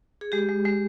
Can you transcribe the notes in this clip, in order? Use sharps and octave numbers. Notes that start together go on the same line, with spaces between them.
G#4
G#3 G4
G#3
G#3